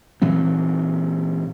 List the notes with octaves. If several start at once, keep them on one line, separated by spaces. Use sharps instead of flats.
A#2 E3 F#3 C4